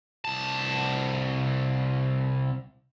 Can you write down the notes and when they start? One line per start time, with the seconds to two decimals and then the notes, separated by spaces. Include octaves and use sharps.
0.25 C2 A5